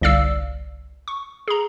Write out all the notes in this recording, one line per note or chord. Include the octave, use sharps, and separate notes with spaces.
G1 C2 D5 F5 E6 C7
C#6
G#4 A#5